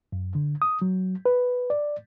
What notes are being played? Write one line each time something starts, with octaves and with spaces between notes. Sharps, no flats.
F#2
D3
D#6
F#3
B4
D5